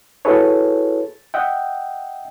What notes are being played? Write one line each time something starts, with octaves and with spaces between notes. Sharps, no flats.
E4 F#4 G#4 A4 B4 C#5
D#5 E5 F#5 G5